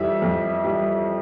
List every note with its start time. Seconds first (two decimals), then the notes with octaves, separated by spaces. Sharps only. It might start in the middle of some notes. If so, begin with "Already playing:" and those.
Already playing: F2 E3 G3 E5
0.22 F2
0.64 E3 G3